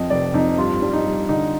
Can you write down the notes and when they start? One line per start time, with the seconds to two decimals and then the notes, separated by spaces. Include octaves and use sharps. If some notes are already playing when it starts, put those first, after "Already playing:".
Already playing: F2 F3 D#5 G5
0.10 F1 D5
0.34 F2 D#4
0.58 G2 F4
0.82 G3
0.93 D#4
1.05 G3
1.29 D3 D#4